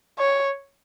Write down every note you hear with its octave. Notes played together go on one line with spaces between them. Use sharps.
C#5